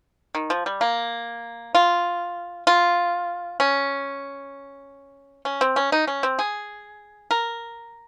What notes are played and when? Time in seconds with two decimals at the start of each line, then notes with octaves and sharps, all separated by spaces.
0.35 D#3
0.50 F3
0.66 G3
0.81 A#3
1.75 F4
2.67 F4
3.60 C#4
5.45 C#4
5.61 C4
5.76 C#4
5.92 D#4
6.07 C#4
6.23 C4
6.39 G#4
7.31 A#4